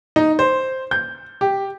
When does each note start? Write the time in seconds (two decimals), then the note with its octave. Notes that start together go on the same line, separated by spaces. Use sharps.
0.16 D#4
0.39 C5
0.91 G6
1.41 G4